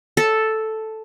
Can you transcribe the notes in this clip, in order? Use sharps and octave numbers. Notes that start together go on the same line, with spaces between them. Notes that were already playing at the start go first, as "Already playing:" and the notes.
A4